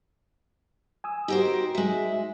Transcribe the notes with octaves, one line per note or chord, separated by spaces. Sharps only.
G#5 D#6 E6
D#4 F#4 G4 A#4 C5
G#3 E5